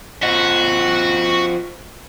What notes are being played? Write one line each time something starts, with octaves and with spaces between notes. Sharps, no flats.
F4 F#4 C5 D#5